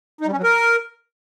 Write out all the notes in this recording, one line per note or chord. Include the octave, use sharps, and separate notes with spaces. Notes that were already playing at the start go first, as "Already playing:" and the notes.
D#4
G3
C#4
F#3
A#4